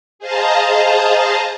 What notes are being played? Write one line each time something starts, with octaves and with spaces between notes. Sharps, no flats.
G#4 C5 D#5 F5 A5 A#5